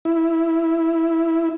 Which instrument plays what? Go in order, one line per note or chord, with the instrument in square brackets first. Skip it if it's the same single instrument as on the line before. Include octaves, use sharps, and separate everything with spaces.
[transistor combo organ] E4